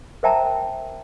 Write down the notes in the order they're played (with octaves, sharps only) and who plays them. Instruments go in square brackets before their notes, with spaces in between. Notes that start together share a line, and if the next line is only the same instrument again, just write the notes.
[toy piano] A#4 C5 E5 G5 A5 A#5